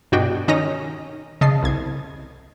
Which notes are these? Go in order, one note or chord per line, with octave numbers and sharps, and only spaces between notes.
G2 B2 D4 F#4 D#5 G5
D#3 C#4 D#4 D#5 A#5 A#6
C#3 D#5 A5 C7
C2 G#6